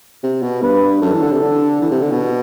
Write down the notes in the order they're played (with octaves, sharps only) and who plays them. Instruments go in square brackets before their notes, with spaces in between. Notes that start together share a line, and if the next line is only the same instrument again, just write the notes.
[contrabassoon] C3
B2
[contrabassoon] G2 [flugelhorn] B4
[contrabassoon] F#2 [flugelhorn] A4
[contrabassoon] E3
D3
C3
D3
E3
C3
D3
B2